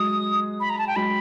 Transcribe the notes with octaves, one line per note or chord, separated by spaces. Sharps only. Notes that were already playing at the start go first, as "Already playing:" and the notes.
Already playing: F#3 G#3 D#6
B5
A#5
A5
G5
F#3 G#3 B5